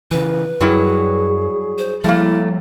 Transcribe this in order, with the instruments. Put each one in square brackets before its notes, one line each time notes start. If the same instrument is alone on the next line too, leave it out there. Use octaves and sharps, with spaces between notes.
[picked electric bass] C#3 E3 [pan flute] B4
[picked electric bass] F#2 [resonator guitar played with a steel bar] F#3 G3 E4 [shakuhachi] G#4
[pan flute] C5
[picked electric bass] F3 G3 [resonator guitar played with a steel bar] A3 A#3 [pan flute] E4